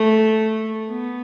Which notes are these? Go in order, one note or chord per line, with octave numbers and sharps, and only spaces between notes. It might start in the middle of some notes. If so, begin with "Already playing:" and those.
Already playing: A3
B3